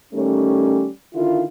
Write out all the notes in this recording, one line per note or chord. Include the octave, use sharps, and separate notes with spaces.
D#3 G3 A3 C#4
D3 D#3 E4 F4